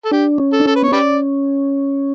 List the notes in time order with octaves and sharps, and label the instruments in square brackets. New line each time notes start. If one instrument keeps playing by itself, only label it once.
[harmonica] A4
[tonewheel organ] D4 [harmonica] G4
[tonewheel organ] C#4
[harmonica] A4
[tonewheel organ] D4
[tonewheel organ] C#4 [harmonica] A4
[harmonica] B4
[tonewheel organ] B3 [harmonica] C#5
[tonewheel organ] C#4 [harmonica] G4 B4 D5